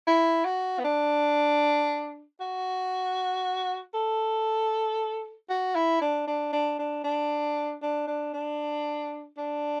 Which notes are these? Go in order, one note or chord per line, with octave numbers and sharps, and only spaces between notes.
E4
F#4
B3
D4
F#4
A4
F#4
E4
D4
D4
D4
D4
D4
D4
D4
D4
D4